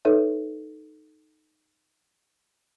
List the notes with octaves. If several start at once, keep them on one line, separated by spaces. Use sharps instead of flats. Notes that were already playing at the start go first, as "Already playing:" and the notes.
D#4 A4 B4 C#5 E5